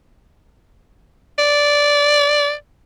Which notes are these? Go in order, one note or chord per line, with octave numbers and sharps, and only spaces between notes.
D5